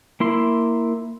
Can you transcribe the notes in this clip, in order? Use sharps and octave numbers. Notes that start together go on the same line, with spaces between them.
A#3 E4 C6